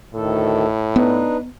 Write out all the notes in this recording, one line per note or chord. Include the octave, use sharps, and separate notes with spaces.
D2 A2 D#3 A4
B3 D4 D#4 B4